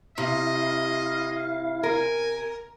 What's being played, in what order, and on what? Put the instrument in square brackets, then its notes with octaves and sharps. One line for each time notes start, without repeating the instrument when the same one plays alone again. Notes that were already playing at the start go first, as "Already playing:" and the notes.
[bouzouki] C3 [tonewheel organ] E4 F5 [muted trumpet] D#5
[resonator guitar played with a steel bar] A#4 [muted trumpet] G#5